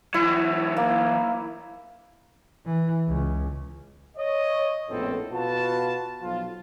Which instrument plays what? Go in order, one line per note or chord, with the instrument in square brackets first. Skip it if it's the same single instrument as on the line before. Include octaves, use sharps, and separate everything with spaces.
[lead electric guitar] E3 F#3 [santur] E4
[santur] A#3
[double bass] E3
C#2
[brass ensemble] C#5 D#5
A#1 F2 A2 B3 C4 A4
B2 F4 F#4 B4 A5
B1 F3 F4